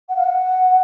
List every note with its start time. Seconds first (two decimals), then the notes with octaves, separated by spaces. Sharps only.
0.09 F#5
0.16 F5
0.23 F#5